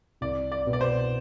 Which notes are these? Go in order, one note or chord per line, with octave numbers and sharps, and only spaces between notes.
C2 D5
D5
B2 B3
D5
C5